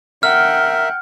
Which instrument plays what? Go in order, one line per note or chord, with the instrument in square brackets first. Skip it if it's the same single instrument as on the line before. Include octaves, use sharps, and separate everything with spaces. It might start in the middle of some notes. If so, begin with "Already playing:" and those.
[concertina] A#4 E5 [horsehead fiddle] F#5 G5 [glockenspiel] F6